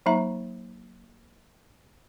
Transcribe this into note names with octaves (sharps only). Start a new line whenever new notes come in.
F#3 A#3 D#4 E5 A#5